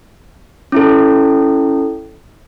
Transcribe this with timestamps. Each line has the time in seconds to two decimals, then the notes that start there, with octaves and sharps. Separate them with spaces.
0.72 C#4 E4 A4